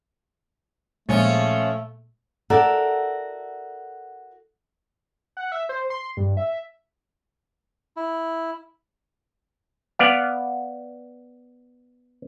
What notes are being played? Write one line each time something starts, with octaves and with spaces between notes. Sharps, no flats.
A#2 F3 G#3 A3 C#4
F#4 A4 A#4 D5 E5
F#5
E5
C5
C6
G2
E5
E4
B3 D5 F5